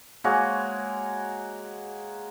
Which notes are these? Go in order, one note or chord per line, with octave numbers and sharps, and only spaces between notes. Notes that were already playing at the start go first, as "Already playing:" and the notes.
G#3 A#3 F#4 C#5